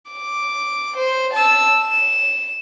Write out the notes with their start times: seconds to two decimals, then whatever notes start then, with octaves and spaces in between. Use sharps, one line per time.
0.11 D6
0.97 C5
1.34 A5 E6
1.82 E7